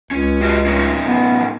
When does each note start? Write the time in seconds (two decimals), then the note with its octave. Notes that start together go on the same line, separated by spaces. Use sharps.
0.11 C#2 C#4
0.41 F#4 G4 D#5
0.66 A2 C#4 D#4
1.07 B3